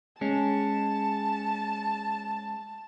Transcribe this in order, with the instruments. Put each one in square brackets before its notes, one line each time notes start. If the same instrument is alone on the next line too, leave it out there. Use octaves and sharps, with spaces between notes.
[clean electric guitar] G#3 C#4 [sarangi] A5